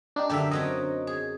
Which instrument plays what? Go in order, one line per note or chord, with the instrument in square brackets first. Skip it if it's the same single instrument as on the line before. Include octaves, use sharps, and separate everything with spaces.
[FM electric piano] D4 D#4 G4
[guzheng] F#2 D3 A#3 [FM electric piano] G4 A4 E5
[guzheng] F#3 C4 C#4 [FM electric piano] D#5
[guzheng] G#4